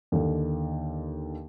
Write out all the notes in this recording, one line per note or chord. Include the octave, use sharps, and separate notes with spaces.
D#2 D3